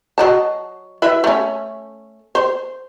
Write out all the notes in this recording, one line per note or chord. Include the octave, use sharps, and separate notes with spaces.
F#3 D#5 A5
E4 B4 E5
A3 C#4
C5